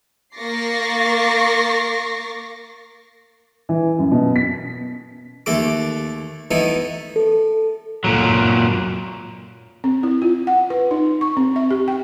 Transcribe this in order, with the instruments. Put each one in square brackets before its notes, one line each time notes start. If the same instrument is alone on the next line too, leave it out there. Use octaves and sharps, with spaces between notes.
[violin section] A#3 C#6 D6 A6 A#6 C7
[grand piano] E3
F#2
B2
B6
[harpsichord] D#2 A3 A4 D6
A3 B3 D#4 E4
[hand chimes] A4
[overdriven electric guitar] A#2 F#3
[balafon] C4
E4
F4
F#5
B4
D#4
C#6
C4
E5
G4
G5